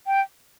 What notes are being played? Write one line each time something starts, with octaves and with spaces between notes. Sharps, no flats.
G5